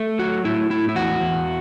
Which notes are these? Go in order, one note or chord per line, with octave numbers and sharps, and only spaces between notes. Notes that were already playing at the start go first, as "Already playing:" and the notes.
Already playing: A3
F#3 F#4
A2 E4
A2 E4
E4
E2 F#4
E2